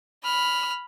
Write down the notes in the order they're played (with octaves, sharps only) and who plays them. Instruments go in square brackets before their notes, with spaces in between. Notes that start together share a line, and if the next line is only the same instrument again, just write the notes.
[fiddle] B5 F6